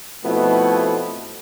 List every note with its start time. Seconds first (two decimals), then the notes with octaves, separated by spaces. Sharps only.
0.25 B2 F3 A3 B3 C4 E4